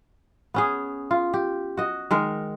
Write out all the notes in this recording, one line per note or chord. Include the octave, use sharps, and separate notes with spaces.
B3 C#4 G#4
F4
G4
F#4 D#5
D#3 G#3 A#4